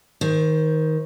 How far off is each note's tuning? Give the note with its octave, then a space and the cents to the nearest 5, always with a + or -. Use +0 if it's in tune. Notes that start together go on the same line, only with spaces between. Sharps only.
D#3 +20 C5 +0